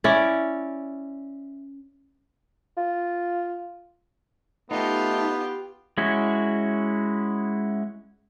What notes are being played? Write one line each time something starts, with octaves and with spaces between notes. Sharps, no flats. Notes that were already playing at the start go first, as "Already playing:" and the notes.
C#4 E4 D5
F4
A3 B3 D#4 F4 G4
G#3 C#4 E4 F#4